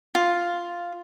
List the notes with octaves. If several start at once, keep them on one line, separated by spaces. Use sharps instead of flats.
F4